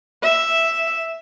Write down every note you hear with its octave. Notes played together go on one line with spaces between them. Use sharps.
E5